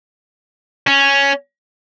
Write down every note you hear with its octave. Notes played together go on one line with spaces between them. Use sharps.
C#4